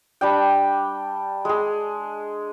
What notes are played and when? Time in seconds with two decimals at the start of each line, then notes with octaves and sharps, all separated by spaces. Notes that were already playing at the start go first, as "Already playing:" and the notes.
0.21 G3 D4 G5
1.45 G#3 G#4